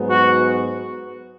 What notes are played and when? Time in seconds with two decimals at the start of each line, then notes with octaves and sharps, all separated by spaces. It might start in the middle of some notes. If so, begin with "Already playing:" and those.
Already playing: G#2 F#3 B3
0.09 F#4